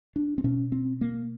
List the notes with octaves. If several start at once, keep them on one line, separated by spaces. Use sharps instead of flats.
D4
C4
B2 C#4
C4
A#3